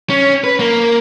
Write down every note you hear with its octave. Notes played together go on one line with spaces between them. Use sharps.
C#4
B4
A#3